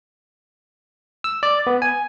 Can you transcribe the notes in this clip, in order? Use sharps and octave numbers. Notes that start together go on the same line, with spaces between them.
E6
D5
B3
G#5